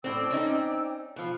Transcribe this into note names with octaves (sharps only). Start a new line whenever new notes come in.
A2 C4 D5 G5 E6
C4 C#4 D#4
B2 F3